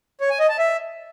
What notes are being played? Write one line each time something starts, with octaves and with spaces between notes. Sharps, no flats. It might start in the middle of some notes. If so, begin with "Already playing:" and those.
C#5
G#5
D#5
A5
E5